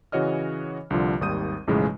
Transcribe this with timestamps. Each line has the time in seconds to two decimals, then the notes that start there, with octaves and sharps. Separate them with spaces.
0.12 C#3 E3 F#4 C#5 D#5 F6
0.90 C2 D3 F3 F4 D5
1.21 G#1 D#2 G3 D#6 G6 D#7
1.67 B1 E2 A2 C#3 F3 G#3